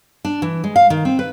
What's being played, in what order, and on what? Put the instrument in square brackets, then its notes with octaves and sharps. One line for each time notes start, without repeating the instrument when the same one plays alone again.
[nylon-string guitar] D4
E3
G#3
F5
D#3
C4
B4